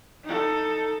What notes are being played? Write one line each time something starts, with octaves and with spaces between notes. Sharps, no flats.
D#4 A4